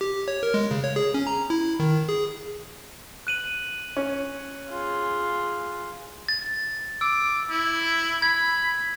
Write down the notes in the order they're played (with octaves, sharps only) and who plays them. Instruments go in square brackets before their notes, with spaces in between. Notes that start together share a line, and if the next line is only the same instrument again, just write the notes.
[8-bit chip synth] G4
C#5
A#4
G#3
C#3
C#5
G#4
C#4
A#5
E4
D#3
G#4
[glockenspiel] F#6 D#7 F#7
[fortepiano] C#4
[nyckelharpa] F4 G#4
[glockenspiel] A6
[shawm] D6 [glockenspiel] E6
[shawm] E4
[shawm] B5 [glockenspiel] G#6